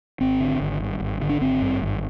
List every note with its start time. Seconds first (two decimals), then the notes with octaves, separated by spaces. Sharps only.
0.21 G#1 C4
0.40 D3
0.61 G#1
0.80 G2
1.00 G#1
1.21 D3
1.29 D4
1.41 G#1 C4
1.62 G2
1.82 G#1